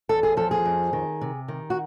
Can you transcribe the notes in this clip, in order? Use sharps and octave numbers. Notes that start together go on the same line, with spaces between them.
E2 A4
G#4
F3 A4
G#4
F2
D#3
C3
D#3
F#4